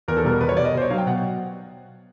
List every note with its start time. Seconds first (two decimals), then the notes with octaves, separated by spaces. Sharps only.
0.08 E2 A#4
0.17 A4
0.24 B2 G3 A#4
0.41 E2 B4
0.49 C#5
0.57 B2 G3 D5
0.65 D#5
0.73 B2 C5
0.82 C#5
0.90 F#3 F5
0.98 G5
1.06 B2 F#5